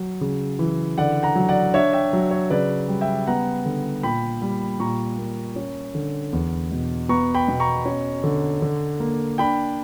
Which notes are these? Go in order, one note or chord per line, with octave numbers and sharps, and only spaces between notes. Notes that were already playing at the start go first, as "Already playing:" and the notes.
Already playing: F#3
C#3
E3
D3 D5 F#5
F#5 A#5
F#3
D5 F#5
D4 C#5 E5
E5 G5
F#3
C#5
C#3 B4 D5
G3
E5 G5
B3 F#5 A#5
D3
A#2 G5 B5
G3
A#2 A#5 C#6
A#3
C#4
D3
E2
B2
B3 A#5 C#6
G5 B5
B2
A#5 C#6
C#4
D3
D3
A#3
D4 G5 B5